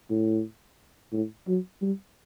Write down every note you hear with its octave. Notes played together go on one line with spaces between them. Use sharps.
A2
A2
F#3
G3